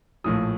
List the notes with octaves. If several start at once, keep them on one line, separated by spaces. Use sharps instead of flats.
A#1 A2 F3 D#6